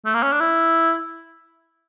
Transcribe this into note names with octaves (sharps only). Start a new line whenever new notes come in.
A3
A#3
C#4
D4
E4